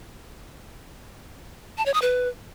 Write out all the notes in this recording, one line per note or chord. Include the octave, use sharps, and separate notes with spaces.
A5
C#5
D#6
B4